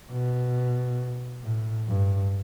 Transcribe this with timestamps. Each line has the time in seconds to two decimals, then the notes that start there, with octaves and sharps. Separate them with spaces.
0.11 B2
1.43 A2
1.88 G2